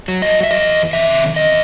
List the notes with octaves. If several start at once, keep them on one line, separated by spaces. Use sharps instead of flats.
F#3
D#5
E5
E2 D#5
C3 D#3 E5
E2 D#5